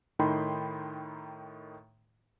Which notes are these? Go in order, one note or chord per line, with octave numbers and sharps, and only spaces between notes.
A2 D#3 D#4 G5 B5 C6